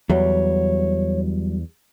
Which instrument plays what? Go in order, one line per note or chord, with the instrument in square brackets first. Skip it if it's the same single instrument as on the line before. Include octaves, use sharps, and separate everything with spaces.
[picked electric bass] E2 [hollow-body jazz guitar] F#3 G3 [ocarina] C#5